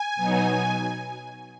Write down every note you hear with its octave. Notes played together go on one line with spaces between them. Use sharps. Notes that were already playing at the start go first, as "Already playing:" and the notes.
Already playing: G#5
B2 F#3 B3 D#4